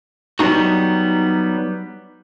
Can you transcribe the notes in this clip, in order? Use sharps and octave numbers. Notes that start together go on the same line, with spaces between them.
F#3 G3 B3 D4 D#4 F#4